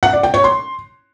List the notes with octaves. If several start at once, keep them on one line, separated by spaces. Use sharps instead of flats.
F#5
D5
G5
C#5
C6